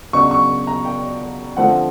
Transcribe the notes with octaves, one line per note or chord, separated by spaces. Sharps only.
C#3 F#3 B3 D4 C#6
C#6
A#5
G5
D3 F3 A3 C4 F#5